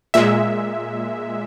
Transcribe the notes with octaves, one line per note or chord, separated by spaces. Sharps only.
A#2 G#3 E5